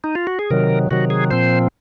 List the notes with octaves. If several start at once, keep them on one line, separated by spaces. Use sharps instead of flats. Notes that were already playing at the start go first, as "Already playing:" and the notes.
D#4
F4
F#4
G#4
C3 D#3 F#3 A#4
C3 D#3 F#3 F#4
G#4
A#2 F3 C4 C5